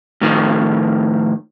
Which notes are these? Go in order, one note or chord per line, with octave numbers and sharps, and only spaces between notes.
A2 D#3 F3